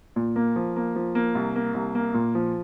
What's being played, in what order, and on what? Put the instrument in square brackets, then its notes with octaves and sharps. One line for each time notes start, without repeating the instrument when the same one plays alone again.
[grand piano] A#2
A#3
F3
A#3
F3
A#3
C2
A#3
C2
A#3
A#2
F3